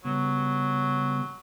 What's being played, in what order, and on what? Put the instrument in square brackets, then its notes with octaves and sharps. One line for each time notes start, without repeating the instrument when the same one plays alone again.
[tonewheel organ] C#3 G3 B3 [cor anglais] F#3